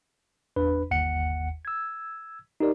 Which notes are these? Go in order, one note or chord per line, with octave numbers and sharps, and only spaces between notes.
G1 E2 D4 B4 B5
G1 D#2 F#5 C#7
E6 G#6
D#4 G4 A#4 D5